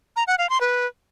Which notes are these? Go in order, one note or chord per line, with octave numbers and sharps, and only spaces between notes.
A#5
F#5
F5
C6
B4